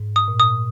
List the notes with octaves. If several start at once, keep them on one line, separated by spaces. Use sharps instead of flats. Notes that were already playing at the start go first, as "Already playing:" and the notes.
Already playing: G#2
D#6
A#2
D#6